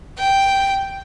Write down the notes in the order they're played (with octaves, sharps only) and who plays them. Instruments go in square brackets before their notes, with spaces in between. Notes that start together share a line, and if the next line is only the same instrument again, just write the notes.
[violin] G5